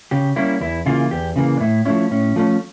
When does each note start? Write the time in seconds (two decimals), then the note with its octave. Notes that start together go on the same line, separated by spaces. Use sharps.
0.11 C#3 G4
0.36 G3 A#3 C#4 E4
0.61 E2 E4
0.86 C#3 E3 A#3 F4
1.11 E2 G4
1.36 C#3 E3 A#3
1.57 D4
1.60 A2 E4
1.85 F3 A3 C#4 E4
2.11 A2 C#4
2.36 F3 A3 C#4